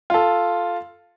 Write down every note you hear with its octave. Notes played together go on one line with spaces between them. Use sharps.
F4 A4